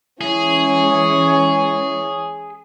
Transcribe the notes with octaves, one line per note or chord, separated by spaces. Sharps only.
E3 G#3 C#4 E4 G#4 C#5